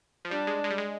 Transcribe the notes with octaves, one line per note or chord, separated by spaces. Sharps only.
F3
G3 D4
G#3
G#3
G3
G#3